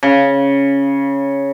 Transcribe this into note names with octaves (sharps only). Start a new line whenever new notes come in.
C#3